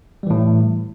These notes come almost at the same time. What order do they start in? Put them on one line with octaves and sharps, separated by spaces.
G3 E3 A2